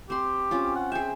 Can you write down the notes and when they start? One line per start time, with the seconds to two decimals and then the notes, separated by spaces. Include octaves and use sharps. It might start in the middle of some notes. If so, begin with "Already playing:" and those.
0.10 C4 G4 C6
0.51 C4 C#4 F4
0.75 F#5
0.92 G#4 E5 G5